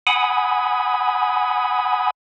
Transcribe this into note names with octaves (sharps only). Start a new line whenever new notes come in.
F#5 G#5 B5 D#6